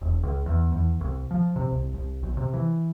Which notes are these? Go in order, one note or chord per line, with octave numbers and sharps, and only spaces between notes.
E1
C#2
E2
E2
C2
F3
C3
C2
C2
B1
C3
E3